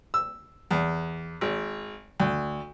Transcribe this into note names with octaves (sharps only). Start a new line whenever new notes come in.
E6
E2
G#1
D2